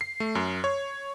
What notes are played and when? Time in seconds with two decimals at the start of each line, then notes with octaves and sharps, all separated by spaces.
0.01 C7
0.20 A3
0.35 F#2
0.64 C#5